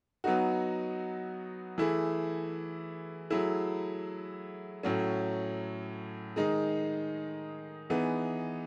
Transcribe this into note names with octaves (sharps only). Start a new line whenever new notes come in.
F#3 B3 D#4 F#4
E3 A3 E4 G#4
F#3 A3 E4 G#4
A2 F#3 C#4
D#3 G#3 D#4 G#4
E3 B3 D#4 G#4